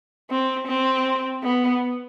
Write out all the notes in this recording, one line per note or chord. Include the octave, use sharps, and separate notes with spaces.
C4
C4
B3